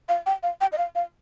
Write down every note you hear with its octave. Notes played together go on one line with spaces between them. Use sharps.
F5
G5
F5
G5
D#5
F5
F5